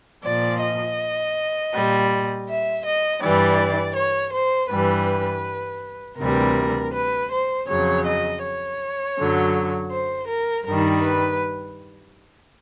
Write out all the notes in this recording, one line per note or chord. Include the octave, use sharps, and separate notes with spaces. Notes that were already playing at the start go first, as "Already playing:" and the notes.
A#2 F3 D5
D#5
A#2 G3
E5
D#5
G2 E3 G3 D5
C#5
C5
G2 E3 G3 B4
D2 C3 E3 G3 A#4
B4
C5
F2 C#3 F#3 C#5
D#5
C#5
F#2 D3 F#3
C5
A#4
G2 D#3 G3 A#4
B4